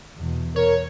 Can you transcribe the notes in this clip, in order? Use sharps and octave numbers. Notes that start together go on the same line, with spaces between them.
E2 B2
A#4 C#5